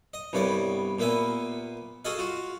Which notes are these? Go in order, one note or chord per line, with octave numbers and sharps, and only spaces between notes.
D#5
C2 G2 B3 C#5 D5
A#2 A#3 B3 E5 G#5
F#4 G#4 A4 D#5 F5
F4 F#4